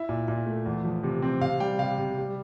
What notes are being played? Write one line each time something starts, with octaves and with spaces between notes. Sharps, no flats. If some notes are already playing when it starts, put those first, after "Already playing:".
Already playing: E4 E5
A#2
A#2
A3
E2
F3
C3
C4
C3 F5
G3 G5
C3 F5
C3
G3